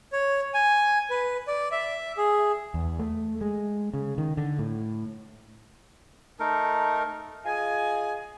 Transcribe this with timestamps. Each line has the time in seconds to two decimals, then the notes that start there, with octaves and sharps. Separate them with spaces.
0.13 C#5
0.54 G#5
1.10 B4
1.48 D5
1.72 E5
2.17 G#4
2.74 E2
2.99 A3
3.41 G#3
3.94 C#3
4.18 D#3
4.37 D3
4.59 A2
6.40 A3 D#4 A#4
7.45 F4 G#4 D#5 G#5